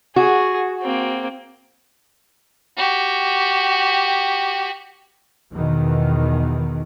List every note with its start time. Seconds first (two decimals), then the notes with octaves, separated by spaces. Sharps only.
0.16 F#4 G#4
0.82 A#3 C4
2.77 F#4 G4
5.53 E2 B2 D#3